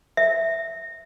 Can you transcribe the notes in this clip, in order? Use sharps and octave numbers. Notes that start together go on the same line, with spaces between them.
E5